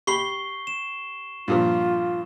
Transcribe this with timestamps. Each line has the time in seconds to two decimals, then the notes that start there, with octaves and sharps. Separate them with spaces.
0.07 G4 B5 C#6 C7 G7
0.67 E7
1.48 G2 A#2 F3 F4